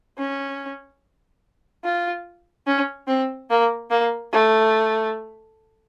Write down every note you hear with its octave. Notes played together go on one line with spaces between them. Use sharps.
C#4
F4
C#4
C4
A#3
A#3
A3